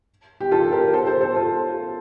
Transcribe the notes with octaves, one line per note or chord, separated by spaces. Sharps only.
G4
F4 A4
G4 A#4
A4 C5
A4 C5
A4 C5
F4 A4